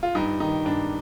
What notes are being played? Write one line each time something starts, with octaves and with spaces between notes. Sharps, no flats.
F4
G2 D#4
D#3 D#4
G2 D4